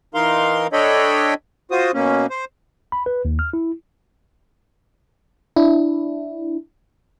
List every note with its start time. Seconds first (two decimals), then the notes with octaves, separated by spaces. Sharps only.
0.14 E3 D#4 A#4 F5 C6
0.73 D4 A4 C#5 D#5 G5 B5
1.71 F4 F#4 C5 D#6
1.94 B2 A#3 C#4
2.30 C5
2.92 B5
3.06 B4
3.25 D#2
3.39 F6
3.53 E4
5.56 D4 E4